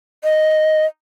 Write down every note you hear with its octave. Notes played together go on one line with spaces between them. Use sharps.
D#5